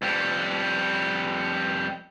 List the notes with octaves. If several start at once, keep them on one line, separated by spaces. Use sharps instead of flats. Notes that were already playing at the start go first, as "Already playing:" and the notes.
F2 G3